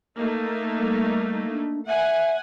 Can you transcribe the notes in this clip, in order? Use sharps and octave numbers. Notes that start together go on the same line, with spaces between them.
A3 A#3 D#4
G3
D4
E5 F#5 G#5